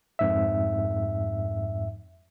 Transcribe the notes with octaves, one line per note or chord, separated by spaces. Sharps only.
F2 G#2 E5